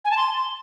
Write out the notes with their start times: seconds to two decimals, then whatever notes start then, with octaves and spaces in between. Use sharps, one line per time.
0.05 G#5
0.11 A5
0.17 C6